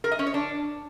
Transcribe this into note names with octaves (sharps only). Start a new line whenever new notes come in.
A#4
D#5
C#4
C#5
D4